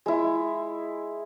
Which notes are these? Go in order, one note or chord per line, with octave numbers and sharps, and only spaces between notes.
G#3 E4